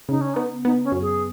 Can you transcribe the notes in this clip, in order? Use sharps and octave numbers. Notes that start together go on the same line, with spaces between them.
C#3 D#4
C#4
B3 D#4
B3 D#4
C#4
F#2
G#4